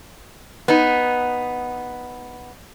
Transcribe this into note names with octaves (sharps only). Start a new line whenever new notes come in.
B3 D#4